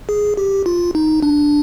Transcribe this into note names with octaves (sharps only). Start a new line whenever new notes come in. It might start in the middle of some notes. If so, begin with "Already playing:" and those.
G#4
G4
F4
D#4
D4